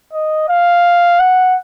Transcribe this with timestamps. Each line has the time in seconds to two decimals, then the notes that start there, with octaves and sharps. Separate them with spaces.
0.13 D#5
0.49 F5
1.20 F#5